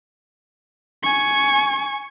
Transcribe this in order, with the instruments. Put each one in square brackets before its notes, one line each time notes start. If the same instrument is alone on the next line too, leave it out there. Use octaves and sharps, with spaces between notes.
[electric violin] G#5 C#6